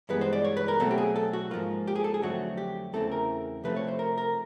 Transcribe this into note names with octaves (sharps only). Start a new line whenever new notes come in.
G2 E3 G#3 B3 B4
C5
D5
C#5
B4
A#4
B2 F#3 A3 C4 A4
G4
G#4
A4
F#4
G#2 F3 A#3 F4
G4
G#4
A4
G#4
F2 D3 F#3 A3 C4 F#4
G4
E2 C#3 E3 A3 C4 A4
A#4
C3 F3 A3 C4 B4
C#5
C5
A#4
A#4